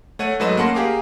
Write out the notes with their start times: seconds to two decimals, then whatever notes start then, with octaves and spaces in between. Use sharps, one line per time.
0.19 A3 C#5 F#5 D#7
0.40 G#2 F#3 A3 B4 D#5 E7
0.57 A#3 C#4 F#5 A5 C6 A#6
0.74 G4 G#4 A#4 F5 D6